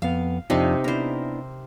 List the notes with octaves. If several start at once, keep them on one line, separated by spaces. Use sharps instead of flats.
F2 B3 F5
F2 C3 D4 D#4 F4
B3 D4 E4 A#4 C5